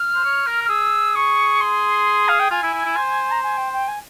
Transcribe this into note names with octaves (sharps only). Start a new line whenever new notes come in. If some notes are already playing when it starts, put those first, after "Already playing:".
Already playing: F6
C5
C#5
A#4
F6
G#4 E6
C#6
C6
F5
G5
F4 G#5
E4
E4
E4
C5
A#5
G#5
G5
G5
G#5